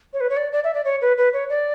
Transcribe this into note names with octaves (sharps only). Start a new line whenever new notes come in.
C#5
B4
C#5
D5
D5
E5
D5
C#5
B4
B4
C#5
D5